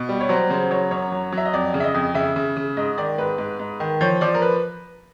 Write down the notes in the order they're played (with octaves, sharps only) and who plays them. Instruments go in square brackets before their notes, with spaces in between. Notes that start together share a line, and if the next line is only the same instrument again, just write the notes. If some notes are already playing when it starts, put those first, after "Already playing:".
Already playing: [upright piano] B2
G3
C#5
F#3 C5
C#3 C5
F#3 C#5
F#2 C#5
F#3
F#3
E5
D#5
F2 D5
C#3
E5
D#5
F2
C#3 E5
C#3
C#3
G#2 D#5
D#3 D5
G#2 B4
G#2
G#2
D#3
F3 C#5
F3 D5
A#4
B4